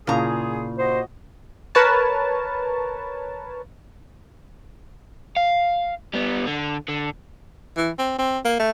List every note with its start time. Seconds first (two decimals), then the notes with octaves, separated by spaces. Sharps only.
0.07 A#2 C#3 E4 F4 G#4 F5 A#5
0.78 F#4 C5 D#5
1.75 A#4 B4 C#5 A5
5.37 F5
6.14 G3 B3
6.47 D3
6.89 D3
7.77 E3
7.98 C4
8.18 C4
8.45 A#3
8.59 A3